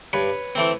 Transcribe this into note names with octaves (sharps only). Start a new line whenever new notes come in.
G2 B4 C#5
E3 A3 C4